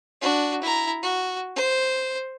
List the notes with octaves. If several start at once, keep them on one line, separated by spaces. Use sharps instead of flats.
D4 F#4
E4 A#5
F#4
C5